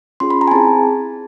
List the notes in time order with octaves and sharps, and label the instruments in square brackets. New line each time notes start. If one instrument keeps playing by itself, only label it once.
[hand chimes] C#4 F4 G#4 C6
B5
A#5
G#5
C4 E4 G#4 A5